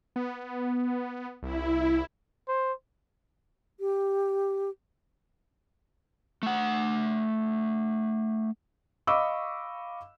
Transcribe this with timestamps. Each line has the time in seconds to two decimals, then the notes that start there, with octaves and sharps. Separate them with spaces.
0.16 B3
1.43 C2 E4
2.48 C5
3.80 G4
6.43 A3 F#5
9.07 D#5 F5 B5 C#6 D6 E6